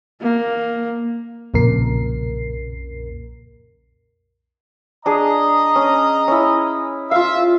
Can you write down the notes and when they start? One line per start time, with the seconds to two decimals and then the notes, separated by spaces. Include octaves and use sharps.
0.21 A#3
1.54 B1 F2 A#2 C#3 A#4 C7
5.06 D4 G#4 D#5 A#5
5.76 C#4
6.28 C#4 E4
7.11 F4 E5 F5